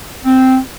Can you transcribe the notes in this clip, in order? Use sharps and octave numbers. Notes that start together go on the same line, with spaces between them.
C4